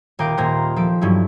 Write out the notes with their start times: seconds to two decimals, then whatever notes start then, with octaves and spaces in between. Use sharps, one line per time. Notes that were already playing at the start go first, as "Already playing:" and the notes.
0.19 D#1 A#4 F5 G5 D6 D#6
0.37 D#1 A#2 A#3 C5 A#5 C7
0.76 F3 A4 D7
1.01 G2 F#3 C#4 E4